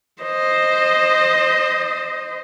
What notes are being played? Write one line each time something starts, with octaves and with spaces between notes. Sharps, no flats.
C5 D#5